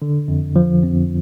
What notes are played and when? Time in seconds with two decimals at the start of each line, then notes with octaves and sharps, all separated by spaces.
0.02 D3
0.28 F2
0.56 F3
0.84 F2